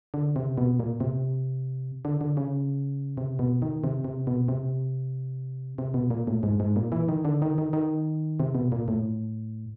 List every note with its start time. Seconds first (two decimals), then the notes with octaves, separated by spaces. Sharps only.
0.14 D3
0.36 C3
0.58 B2
0.79 A#2
1.00 C3
2.05 D3
2.21 D3
2.37 C#3
3.17 C3
3.39 B2
3.62 D#3
3.84 C3
4.05 C3
4.27 B2
4.48 C3
5.78 C3
5.94 B2
6.10 A#2
6.27 A2
6.43 G#2
6.60 G#2
6.76 A#2
6.92 E3
7.09 D#3
7.25 D3
7.42 D#3
7.58 D#3
7.73 D#3
8.40 C3
8.55 B2
8.72 A#2
8.88 A2